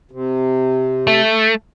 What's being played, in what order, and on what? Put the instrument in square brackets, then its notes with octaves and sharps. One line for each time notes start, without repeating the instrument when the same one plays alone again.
[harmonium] C3
[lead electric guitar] A3